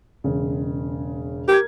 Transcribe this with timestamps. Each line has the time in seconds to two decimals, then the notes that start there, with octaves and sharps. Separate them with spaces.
0.24 E1 C#3
1.48 G4 A#4 G#6